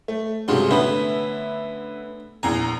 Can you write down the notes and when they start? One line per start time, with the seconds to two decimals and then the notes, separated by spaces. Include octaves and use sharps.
0.08 A3
0.48 G2 C3 F#3 G#3 F4
0.71 D3 A3 B3 C#4 B4 E5
2.43 A#1 E2 G#5 A#5